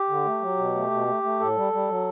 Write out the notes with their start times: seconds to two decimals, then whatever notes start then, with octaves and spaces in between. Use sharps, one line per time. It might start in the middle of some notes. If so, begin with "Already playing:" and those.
Already playing: G4
0.09 D3
0.25 A3
0.42 F#3
0.58 B2
0.74 A3
0.91 B2
1.07 A3
1.23 A3
1.40 A2 A4
1.56 G3
1.73 G3
1.89 F#3